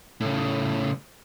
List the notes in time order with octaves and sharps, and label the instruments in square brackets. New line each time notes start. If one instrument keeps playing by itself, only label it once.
[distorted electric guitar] A2 C#3